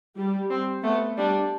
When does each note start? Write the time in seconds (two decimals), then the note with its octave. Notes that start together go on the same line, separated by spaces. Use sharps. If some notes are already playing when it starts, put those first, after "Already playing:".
0.17 G3
0.50 C4
0.83 A3 B3
1.17 G3 D4